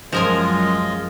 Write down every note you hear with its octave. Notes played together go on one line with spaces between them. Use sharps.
F#2 F3 G#3 F4 A#4 D#5 G#5